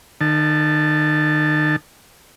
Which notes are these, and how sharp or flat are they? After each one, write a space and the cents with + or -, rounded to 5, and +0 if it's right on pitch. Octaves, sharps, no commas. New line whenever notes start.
D#3 -35 A5 +0